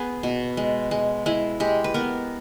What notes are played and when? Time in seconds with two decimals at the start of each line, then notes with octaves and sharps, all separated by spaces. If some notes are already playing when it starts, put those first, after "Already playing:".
Already playing: B3 G#4
0.23 B2
0.57 G#3
0.91 G#3
1.26 G#3 E4
1.60 G#3 G4
1.84 B4
1.94 B3 A#4